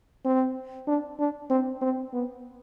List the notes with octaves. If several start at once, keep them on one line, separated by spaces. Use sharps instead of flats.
C4
D4
D4
C4
C4
B3